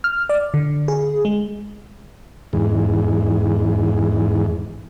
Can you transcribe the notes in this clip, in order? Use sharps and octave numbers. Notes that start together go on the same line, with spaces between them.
F6
D5
D3
G#4
G#3
E2 G#2